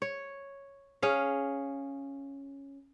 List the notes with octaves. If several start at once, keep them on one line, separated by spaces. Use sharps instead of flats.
C#5
C#4 G#4 F5